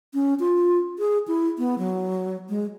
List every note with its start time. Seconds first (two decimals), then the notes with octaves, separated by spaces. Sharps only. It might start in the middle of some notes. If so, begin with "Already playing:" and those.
0.14 C#4
0.40 F4
0.99 G#4
1.28 E4
1.58 B3
1.78 F#3
2.49 G#3